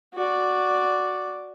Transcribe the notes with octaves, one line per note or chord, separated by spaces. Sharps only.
F#4 D5